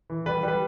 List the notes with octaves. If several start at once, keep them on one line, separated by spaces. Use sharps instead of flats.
E3
G3 B4
G3 B4